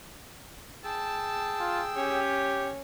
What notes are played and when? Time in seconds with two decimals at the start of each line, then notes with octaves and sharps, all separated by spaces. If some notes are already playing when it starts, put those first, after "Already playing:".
0.84 G#4 G5 A5 E6
1.60 F4
1.95 C#4 G4 C#5